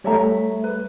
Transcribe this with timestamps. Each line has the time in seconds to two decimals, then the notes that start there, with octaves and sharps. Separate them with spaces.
0.04 G3 A3 C#5 E5 A#5
0.64 B4